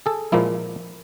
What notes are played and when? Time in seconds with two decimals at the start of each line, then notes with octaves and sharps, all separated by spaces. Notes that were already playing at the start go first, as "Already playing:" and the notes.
0.06 G#4 A4
0.32 A#2 F3 G#3 A#3 E4